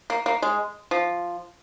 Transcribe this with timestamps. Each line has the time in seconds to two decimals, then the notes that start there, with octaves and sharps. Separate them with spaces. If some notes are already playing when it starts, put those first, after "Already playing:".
0.10 A#3
0.26 A#3
0.42 G#3
0.91 F3